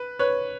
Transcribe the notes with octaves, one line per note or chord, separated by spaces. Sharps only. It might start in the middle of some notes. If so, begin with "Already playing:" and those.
Already playing: B4
B4 C#5